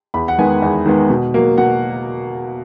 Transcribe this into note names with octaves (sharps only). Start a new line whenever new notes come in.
E2 B5
F#5
D#3 G#3 B3 G#5
E2
D#3 G#3 B3
B2
F#3 A#3
B2 F#5